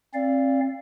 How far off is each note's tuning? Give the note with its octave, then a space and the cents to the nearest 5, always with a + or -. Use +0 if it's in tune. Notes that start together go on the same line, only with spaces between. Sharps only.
C4 +40 D5 -15 F5 -10